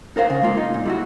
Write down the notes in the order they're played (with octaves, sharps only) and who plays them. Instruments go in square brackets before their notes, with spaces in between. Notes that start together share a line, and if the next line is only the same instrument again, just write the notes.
[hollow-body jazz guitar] D#4 A#4 C5 F5
C#3
G#3 A#3 F4
D#4
A#2
G3 E4 F#4